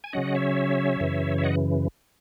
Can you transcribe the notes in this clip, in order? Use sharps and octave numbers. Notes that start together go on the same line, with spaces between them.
G#5
C#3 F#3 C#4 D#5 F#5
C#5 E5
F#2 C#3 E3
E5
D#5 F#5